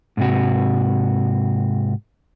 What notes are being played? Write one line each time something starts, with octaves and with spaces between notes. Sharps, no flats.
G#2 C3 F#4